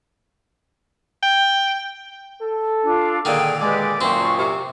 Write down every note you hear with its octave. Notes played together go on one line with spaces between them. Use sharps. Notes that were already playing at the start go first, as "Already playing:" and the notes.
G5
A4
D4 F4
A#2 D3 D#3 G#4 G5
G#3 G4 B4 D5
F#2 A#2 C4 C5 F5 C#6 D#6
C3